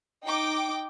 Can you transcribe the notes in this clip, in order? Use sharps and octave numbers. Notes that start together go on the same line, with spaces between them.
D#4 G5 D6